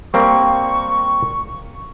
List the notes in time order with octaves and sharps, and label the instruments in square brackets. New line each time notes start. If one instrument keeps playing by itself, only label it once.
[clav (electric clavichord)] G3 A#3 C4 [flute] C#6